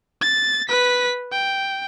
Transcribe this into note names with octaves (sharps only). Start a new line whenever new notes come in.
A6
B4 B6
G5